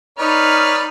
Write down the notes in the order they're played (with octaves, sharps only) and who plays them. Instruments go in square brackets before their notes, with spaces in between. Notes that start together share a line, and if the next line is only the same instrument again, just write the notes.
[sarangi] D#4 [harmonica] B4 C#5 D5 [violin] F6